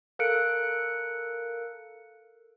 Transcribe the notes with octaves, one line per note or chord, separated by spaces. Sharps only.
A4 A#4 F5 F#6 C#7 D7